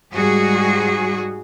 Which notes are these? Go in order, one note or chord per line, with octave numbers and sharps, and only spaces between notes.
G#2 G3 F#4 G#4